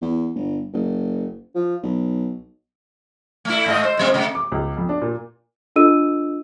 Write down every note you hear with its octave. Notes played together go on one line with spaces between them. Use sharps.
E2
G1
F#1
F3
B1
A3 E4
G#2 A3 D#5
C5
A2 G3 C4
C3 A3
D6
C#2
F2
D4
A#2
D4 F4 A4 D#5 E6 D#7